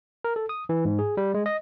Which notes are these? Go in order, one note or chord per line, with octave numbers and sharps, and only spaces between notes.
A#4
A4
D#6
E3
G#2
G#4
G3
G#3
D#5